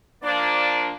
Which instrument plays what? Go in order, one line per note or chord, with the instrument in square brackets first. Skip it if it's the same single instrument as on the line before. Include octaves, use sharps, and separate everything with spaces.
[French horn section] F3 A#3 D4 [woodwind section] D5